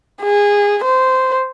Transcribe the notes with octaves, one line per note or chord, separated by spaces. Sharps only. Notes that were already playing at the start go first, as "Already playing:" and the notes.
G#4
C5